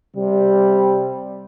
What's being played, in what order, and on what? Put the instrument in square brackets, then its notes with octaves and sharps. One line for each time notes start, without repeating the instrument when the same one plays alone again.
[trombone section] C3 G3